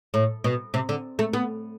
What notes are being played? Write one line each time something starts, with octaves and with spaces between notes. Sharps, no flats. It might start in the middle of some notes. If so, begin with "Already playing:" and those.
A2
B2
C3
D3
A3
B3